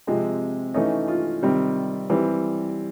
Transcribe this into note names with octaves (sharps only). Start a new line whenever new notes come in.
C3 F3 G#3 C4
E3 A3 C#4 D#4
F4
C3 D#3 G3 C4
E3 G3 C4